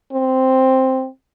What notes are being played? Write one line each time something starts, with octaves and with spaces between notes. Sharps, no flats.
C4